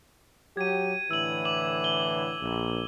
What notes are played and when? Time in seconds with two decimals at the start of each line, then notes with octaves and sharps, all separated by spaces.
0.57 F#3 G4 G#6 D#7
1.11 A2 D3 E3 E6 F#7
1.45 D6 F#7
1.84 G7
2.40 A#1